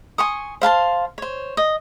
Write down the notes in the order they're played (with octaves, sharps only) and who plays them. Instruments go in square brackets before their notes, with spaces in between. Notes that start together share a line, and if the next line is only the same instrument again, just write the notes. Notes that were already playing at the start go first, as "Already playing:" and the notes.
[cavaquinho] G#5 C6 C#6 D#6
C5 F5 A5 C6
C5 C#5
D#5